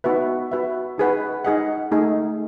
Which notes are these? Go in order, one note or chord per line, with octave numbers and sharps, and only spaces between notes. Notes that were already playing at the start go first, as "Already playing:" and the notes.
B3 D#4 F#4 B4 E5
F#4 B4 E5
D#4 G#4 B4 F#5
D#4 G#4 D#5 F#5
A3 D#4 G#4